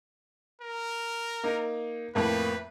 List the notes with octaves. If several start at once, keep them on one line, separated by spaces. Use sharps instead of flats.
A#4
A#3 D#4
F2 A2 A#3 B4